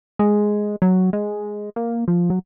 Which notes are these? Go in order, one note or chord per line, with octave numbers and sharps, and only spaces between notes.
G#3
F#3
G#3
A#3
F3
F#3